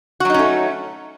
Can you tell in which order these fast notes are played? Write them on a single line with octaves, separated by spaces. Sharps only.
F#4 F#3 D#4 C#4 A3